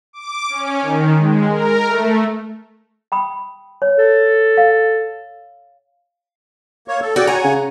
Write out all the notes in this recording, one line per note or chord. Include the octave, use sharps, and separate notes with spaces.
D6
C#4
D#3
G#3
A#4
A3
G5 B5 D#6
C#5
A4
F5
A#3 C#5
A4
F#4 G#4 D5 F#5 G5
C#5 F#5 G#5 A#5
C#3